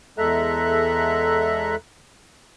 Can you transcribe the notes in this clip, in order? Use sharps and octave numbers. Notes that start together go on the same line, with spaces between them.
E2 G#3 A4 E5 A#5 F#6